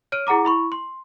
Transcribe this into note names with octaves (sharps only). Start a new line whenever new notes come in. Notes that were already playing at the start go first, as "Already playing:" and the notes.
C#5 F6 D7 D#7
E4 G#4 F#5 A#5 D6
E4 B5 C#6
C6